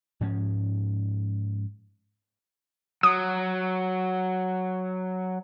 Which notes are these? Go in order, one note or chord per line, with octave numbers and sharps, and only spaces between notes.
G#2 F3 C#4
F#3 D#6